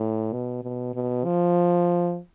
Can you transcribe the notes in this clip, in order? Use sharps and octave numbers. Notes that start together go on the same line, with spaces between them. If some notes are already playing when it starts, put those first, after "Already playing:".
Already playing: A2
B2
B2
B2
F3